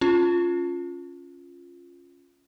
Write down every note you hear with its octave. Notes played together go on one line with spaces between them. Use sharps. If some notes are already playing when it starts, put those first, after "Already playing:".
C#4 F4